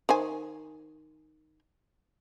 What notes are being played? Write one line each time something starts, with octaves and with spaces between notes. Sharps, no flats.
D#3 C5 G#5